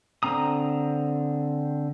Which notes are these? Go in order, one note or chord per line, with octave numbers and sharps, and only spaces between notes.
D3 C4 A#5 D#6